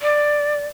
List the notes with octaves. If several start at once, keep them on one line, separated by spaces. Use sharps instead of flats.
D5